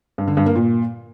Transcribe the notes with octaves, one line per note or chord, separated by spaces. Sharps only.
G2
D3
G2
A#3
A#2